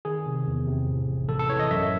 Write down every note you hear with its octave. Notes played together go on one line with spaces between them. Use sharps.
D#3 G#4
C3
E2
C3
A2
A1
A1 A4
A4
E3 C#5
D#5
F#2 E5